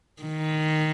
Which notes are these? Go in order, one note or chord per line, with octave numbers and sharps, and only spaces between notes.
D#3